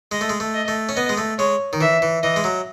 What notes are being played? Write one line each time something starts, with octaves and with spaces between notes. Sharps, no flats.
G#3 D#5
A3
G#3
A3
D#5
A3
C#4
B3 D#5
G#3
A3
G#3 C#5
D#3
E3 E5
E3
E3 D#5
G#3
F#3